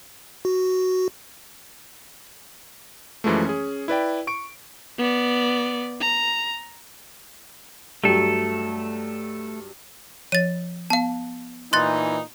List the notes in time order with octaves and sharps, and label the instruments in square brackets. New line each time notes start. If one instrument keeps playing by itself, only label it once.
[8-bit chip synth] F#4
[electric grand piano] F#2 E3 F3 G#3 A3
C#4 G#4
E4 B4 D5 G5
C#6 D7
[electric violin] B3 D5
A#5
[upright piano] G2 F#3 [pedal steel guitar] A3 A4
[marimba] F3 C#5 [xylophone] A6 D#7
[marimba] B3 [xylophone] F5 A5
[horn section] A#2 E3 D#4 [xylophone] C6 F#6 A6